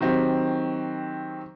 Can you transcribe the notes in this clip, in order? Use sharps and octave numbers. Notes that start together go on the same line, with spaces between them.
D#3 F#3 C4 G4